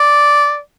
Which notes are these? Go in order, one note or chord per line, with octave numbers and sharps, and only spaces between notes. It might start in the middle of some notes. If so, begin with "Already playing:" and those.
Already playing: D5